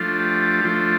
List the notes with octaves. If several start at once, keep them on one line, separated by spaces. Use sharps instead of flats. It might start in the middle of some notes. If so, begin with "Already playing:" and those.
Already playing: F3 A3 D4 F4
G4
F3 A3 D4 F4